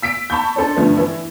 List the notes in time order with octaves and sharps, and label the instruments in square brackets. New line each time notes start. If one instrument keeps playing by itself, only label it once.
[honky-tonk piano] E6 B6 D7
A5 B5 C#6 G6
D4 A4 C5 D5
G2 D3 F3 A3 B3
E3 E4